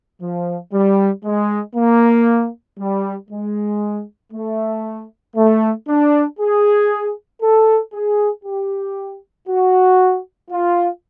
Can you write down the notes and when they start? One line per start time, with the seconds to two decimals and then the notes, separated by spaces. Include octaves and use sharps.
0.21 F3
0.73 G3
1.24 G#3
1.76 A#3
2.79 G3
3.30 G#3
4.33 A3
5.36 A3
5.88 D4
6.39 G#4
7.42 A4
7.93 G#4
8.45 G4
9.48 F#4
10.51 F4